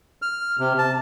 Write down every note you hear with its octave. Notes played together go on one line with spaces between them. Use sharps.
F6
C3
A5